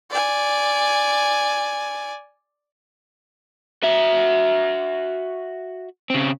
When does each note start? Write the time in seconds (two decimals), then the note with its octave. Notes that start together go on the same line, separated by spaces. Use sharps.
0.11 D5 G#5
3.83 F#4 E5
6.10 C#3 C4